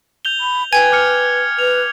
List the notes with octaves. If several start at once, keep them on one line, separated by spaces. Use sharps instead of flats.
G6 F7 G7
B5
B4 G5 G#5 G#6
D6 F6 C#7
B4 F7